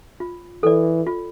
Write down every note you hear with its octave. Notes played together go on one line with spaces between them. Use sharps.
F4
E3 A4 D5
F4